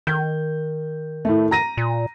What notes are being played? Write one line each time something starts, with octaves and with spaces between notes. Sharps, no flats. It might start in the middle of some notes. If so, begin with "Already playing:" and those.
D#3 G6
A2 A3
A#5 A#6 D#7
A#2